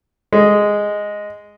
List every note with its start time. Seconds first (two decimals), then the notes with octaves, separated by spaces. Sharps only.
0.33 G#3